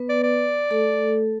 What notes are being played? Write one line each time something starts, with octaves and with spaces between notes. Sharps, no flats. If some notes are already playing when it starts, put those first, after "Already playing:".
Already playing: B3 B4
D5
D5
A3 A4